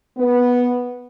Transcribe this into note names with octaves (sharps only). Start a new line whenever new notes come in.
B3